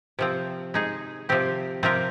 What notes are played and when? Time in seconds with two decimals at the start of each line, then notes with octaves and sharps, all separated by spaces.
0.19 C3 F3 C4
0.74 G#3 D#4 G#4
1.29 C3 F3 C4 G4
1.83 C3 F3 C4 G4 A#4